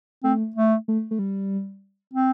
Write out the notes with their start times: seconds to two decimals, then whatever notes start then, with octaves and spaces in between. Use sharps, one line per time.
0.24 A3 C4
0.56 A3
0.88 A3
1.11 A3
1.19 G3
2.14 C4